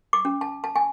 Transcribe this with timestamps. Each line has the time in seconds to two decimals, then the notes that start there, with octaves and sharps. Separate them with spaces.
0.13 D6
0.25 C#4
0.41 A5
0.64 A5
0.76 G#5